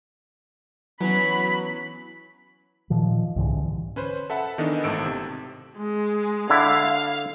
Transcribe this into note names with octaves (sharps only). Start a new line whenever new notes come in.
E3 F#3 B3 C#4 B5
A#2 D#3 F3
C2 G#2 D3 E3
C#4 B4 C5
A4 E5 F#5 A5 B5
D#3 E3 B3 D4 A4 D#5
G#1 A2 A4 E6 D7
C3
G#3
D3 E4 F5